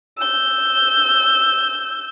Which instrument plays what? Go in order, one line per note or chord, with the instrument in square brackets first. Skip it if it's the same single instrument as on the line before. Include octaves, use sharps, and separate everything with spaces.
[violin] E6 G6